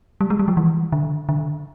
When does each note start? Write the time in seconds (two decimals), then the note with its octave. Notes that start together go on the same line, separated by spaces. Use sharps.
0.21 G3
0.30 G#3
0.39 G3
0.48 F3
0.57 E3
0.92 D3
1.29 D3